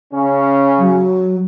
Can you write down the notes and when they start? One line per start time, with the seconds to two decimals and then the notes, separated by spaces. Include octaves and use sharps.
0.13 C#3 C#4
0.78 F#3